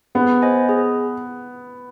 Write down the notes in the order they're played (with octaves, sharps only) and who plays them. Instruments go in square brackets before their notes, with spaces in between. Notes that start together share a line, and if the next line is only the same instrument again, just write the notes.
[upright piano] B3 [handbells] G#4
[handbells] C5 D#5 G#5
G#4